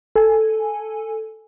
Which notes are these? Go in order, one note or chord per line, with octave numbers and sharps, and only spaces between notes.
A4 G#5